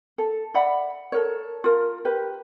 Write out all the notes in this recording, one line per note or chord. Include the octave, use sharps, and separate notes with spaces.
A4
D5 E5 F#5 B5
A4 A#4 C#5
F4 A#4
G4 A#4 B4